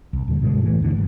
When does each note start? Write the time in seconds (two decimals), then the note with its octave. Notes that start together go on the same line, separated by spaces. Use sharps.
0.13 C2
0.28 D#2 A#2 D3 G3
0.41 G2 B2 D3 G#3
0.63 A2 E3 A3
0.81 E2 D3 E3
0.94 F#1 G2